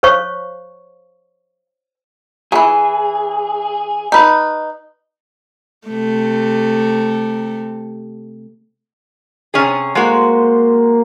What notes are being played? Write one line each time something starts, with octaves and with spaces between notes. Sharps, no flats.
C5 C#5 F5 C#6
E3 F#3 G#4
D#4 B4
C3 A3
C3 C#4 G#4
G#3 A#3 F#4 C5